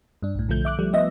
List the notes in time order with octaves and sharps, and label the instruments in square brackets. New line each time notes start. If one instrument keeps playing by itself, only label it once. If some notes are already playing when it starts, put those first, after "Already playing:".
[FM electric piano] G2 D4
B1 A2
B1 D3 F3 A3 G6
E5 D6 F#6
F3 G3 A3
F3 B3 D#5 E5 A#6